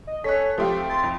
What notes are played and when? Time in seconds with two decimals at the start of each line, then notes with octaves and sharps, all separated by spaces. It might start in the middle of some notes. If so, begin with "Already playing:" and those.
0.07 D#5
0.24 C#4 A4 C#5 F#6 B6
0.58 F3 A3 C4 G4 F5
0.90 C6 A6
1.03 F2